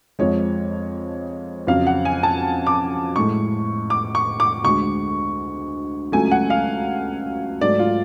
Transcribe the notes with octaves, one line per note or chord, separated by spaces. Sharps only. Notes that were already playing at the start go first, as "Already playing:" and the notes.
F2 F3 G#3 C#5
F2 C#3 F#3 F5
F#5
G#5
A5
D6
A2 G#3 C#6
D6
C#6
D6
D2 D3 G#3 C#6
C#2 C#3 F#3 A3 G#5
F#5
F5
G#2 F#3 A3 D5
F4